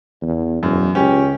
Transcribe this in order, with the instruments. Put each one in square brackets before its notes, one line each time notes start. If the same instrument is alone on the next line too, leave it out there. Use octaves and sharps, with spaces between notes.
[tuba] E2
[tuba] E1 [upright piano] F#2
[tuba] C#2 [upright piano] C#4 G4